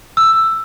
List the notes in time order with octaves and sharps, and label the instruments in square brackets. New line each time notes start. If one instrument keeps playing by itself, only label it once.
[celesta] E6